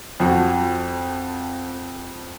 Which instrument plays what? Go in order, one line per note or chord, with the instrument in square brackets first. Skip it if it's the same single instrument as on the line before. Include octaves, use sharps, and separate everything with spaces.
[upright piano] F2 F3 F#4